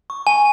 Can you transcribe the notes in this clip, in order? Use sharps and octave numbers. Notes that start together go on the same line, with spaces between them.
C#6
G#5